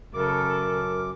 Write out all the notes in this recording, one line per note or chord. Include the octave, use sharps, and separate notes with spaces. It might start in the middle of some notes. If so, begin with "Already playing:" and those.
F#2 C#3 A4 A#4 D6